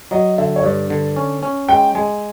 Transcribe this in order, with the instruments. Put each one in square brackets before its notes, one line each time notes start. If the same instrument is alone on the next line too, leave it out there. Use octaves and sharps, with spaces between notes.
[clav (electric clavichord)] F#3 [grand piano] D#5
[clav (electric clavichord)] D3 [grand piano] E5
[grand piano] C#5
[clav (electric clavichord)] G2 [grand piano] D5
[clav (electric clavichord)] D3
C#4
C#4
[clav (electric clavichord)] G#3 [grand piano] G5
[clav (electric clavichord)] G#3 [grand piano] G#5